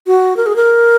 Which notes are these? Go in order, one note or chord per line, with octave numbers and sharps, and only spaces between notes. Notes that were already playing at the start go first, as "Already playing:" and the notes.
F#4
A#4
G#4
A#4